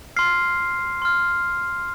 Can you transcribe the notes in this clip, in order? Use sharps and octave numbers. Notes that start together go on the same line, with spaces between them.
C6 F6 C7
C6 F6